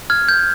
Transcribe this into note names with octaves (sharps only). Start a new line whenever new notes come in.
F6 G#6
G6